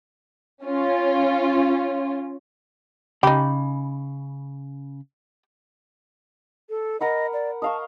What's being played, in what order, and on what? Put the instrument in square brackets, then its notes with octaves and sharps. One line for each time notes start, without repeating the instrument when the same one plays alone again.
[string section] C#4 F4
[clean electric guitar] C#3 B5 [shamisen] D#4 G4
[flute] A4
[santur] A#4 F#5 B5 [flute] D#5
[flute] D5
[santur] D#5 F5 C#6 [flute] A5